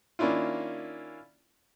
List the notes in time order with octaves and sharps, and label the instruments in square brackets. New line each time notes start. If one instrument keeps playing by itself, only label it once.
[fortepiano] D#3 A#3 C#4 D4 E4 F4